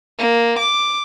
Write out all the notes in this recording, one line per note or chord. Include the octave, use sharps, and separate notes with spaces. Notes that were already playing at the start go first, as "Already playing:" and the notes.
A#3
D6